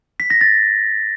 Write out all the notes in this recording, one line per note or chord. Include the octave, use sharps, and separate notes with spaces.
B6
A#6
A6